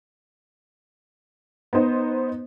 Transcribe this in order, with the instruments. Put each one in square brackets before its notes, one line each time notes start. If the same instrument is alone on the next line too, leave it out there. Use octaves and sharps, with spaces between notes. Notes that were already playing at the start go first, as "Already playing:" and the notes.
[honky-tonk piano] B3 D#4 C5 D#5